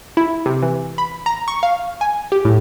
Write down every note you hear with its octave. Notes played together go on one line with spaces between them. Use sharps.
E4
C3
E3
B5
A#5
C#6
F5
G#5
G4
A2